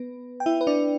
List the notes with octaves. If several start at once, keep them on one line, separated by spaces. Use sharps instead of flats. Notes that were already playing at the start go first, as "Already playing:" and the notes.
Already playing: B3 B4
G5
E4 E5
B4
D4 D5